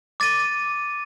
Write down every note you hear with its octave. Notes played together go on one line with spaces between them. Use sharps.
D6 A6 D#7